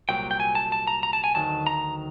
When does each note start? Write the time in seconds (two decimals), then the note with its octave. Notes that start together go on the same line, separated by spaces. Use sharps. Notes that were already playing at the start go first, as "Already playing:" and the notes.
0.09 C2 A#2 F#3 G5
0.31 G5
0.40 G#5
0.55 A5
0.72 A5
0.87 A#5
1.03 A#5
1.13 A5
1.24 G#5
1.34 D2 C3 D#3 F#3 A5
1.67 A#5